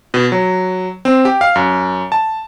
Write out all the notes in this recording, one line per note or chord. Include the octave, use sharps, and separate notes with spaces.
B2
F#3
C4
G4
F5
F#2
A5